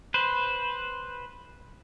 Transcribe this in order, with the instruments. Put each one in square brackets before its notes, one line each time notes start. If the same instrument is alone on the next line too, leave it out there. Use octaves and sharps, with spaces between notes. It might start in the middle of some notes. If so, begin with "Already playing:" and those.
[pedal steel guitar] B4 C5